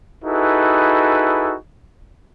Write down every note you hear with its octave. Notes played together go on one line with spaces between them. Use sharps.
D#4 E4 F#4 G#4 A4 B4